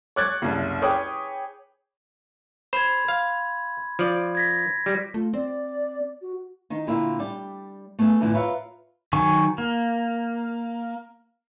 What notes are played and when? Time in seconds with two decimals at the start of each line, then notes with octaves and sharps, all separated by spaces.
0.16 C#5 D6 F#6 G#6 A6
0.42 F#1 C2
0.82 G#4 B4 C#5 G5 D6 D#6
2.73 C5 B5 C6 G#6
3.08 F5
3.99 F3 D5
4.35 G#6 A#6 B6
4.86 G3 A#6
5.14 A3 F4
5.34 C4 D5
6.22 F#4
6.70 D#3 D#4
6.87 A#2 D3 C4 E4 F4 A#4
7.19 G3 G4 D5
7.99 A3 B3 G#4 A4
8.21 F2 A2 D3 E3
8.34 F4 A#4 B4 C#5 E5
9.13 D#3 F#3 G#5 C#6
9.58 A#3